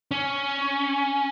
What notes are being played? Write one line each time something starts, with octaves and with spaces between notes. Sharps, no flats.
C#4